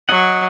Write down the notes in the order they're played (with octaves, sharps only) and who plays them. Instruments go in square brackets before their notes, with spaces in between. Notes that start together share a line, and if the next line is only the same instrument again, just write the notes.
[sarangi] F#3 [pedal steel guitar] D#5 F#5